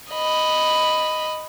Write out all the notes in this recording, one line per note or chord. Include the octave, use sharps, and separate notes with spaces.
D#5 B5